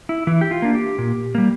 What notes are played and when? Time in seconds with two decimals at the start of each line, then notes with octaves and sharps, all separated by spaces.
0.09 E4
0.27 E3 E4
0.41 G4
0.51 F4
0.62 A#3 D4
0.75 G4
0.98 A#2
1.35 G3 A#3